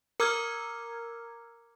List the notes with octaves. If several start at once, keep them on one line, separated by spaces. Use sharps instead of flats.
A#4 A#5 D6 E6 F6 G#6